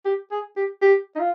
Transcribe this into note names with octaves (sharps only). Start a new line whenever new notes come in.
G4
G#4
G4
G4
D#4
F4